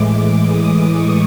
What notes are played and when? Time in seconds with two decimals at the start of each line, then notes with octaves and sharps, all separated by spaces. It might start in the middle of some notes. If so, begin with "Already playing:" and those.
Already playing: A2 E3 G#3 D6
0.45 D#6
0.90 C#6